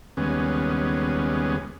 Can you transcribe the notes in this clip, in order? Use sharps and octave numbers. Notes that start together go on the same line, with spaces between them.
D#2 C#3 G3 G#3 B3 C#4